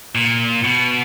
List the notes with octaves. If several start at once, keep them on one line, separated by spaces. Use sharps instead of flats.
A#2
B2